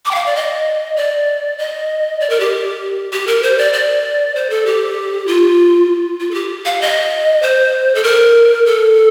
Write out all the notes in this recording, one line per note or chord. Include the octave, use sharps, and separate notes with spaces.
D6
G5
F5
D5
D#5
D5
D#5
D5
A#4
G4
G4
A#4
C5
D5
D5
C5
A4
G4
F4
F4
A4
G4
F5
D#5
C5
A4
A#4
A4